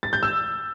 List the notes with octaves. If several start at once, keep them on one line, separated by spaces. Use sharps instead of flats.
A6
G6
E6